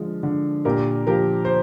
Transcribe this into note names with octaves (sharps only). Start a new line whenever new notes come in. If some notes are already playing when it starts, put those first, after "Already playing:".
Already playing: D3 F3 G#3
D3
A#2 G4 A#4
F3 G4 A#4
C5